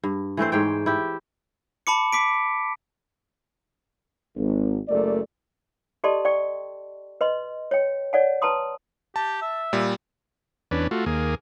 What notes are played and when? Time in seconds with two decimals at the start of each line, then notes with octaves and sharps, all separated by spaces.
0.03 G2
0.37 E3 A3 C4 C5
0.52 G#2 C5 C#5 G5
0.86 E4 G4
1.87 A5 B5 D6 C#7
2.13 D6 B6 D7
4.36 G#1
4.88 F#1 A3 A#4 D5
6.04 G4 A4 D5 D#5 A5 C6
6.25 D5 G5 C#6
7.21 B4 D#5 C6
7.71 C#5 G5
8.13 C#5 D5 F#5 G#5
8.42 B4 A5 A#5 C6 D#6
9.16 G4 A5
9.41 E5
9.73 A#2 G3
10.71 E2 C#4 D4 B4
10.91 A3 F4 F#4
11.06 D#2 A#3 G#4